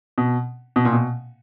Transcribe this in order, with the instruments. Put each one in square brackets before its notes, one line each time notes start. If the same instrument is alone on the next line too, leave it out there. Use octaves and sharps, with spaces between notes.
[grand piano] B2
B2
A#2
B2